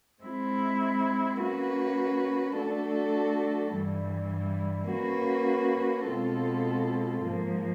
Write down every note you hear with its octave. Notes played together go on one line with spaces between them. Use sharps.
G#3 C4 E4
A#3 C#4 F#4 B4
A3 D4 F#4 A4
G2 E3 G3
A#3 C#4 F#4 B4
B2 G#3 C4 F4 A4
G#2 F3 A#3